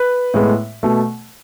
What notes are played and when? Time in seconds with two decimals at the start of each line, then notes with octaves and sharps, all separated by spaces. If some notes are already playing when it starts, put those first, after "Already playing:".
Already playing: B4
0.34 A2 G#3 B3
0.83 B2 A3